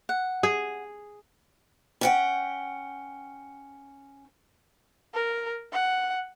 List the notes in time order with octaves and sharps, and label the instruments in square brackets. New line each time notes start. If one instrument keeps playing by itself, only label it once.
[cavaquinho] F#5
[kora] G#4
[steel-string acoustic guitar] C#4 F#5 G5
[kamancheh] A#4
F#5